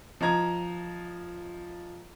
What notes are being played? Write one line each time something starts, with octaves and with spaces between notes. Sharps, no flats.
F3 D#5 A#5 G#6